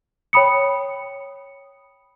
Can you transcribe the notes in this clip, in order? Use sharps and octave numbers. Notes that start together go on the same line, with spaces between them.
C#5 G5 B5 D#6 C#7